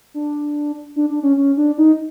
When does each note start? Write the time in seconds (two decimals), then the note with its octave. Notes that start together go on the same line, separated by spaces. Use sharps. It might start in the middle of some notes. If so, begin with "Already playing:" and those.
0.14 D4
0.96 D4
1.10 D4
1.23 C#4
1.37 C#4
1.57 D4
1.78 D#4